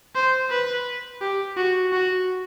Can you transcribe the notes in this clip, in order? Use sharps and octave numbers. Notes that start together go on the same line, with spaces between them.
C5
B4
G4
F#4
F#4